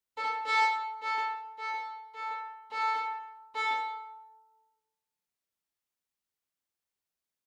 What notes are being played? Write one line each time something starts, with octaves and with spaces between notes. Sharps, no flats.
A4
A4
A4
A4
A4
A4
A4